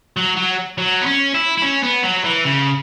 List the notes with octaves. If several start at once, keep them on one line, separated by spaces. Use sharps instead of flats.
F#3
F#3
F#3
B3
C#4
E4
E4
C#4
B3
F#3
E3
C#3